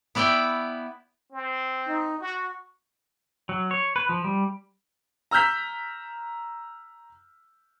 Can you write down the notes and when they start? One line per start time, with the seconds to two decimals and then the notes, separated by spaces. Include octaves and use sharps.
0.15 B3 E4 D5 E5 G5
1.32 C4
1.87 D#4
2.20 F#4 C#6
3.49 F#3
3.71 C#5
3.96 B4
4.09 F3
4.24 G3
5.31 A#5 E6 F6 G6 B6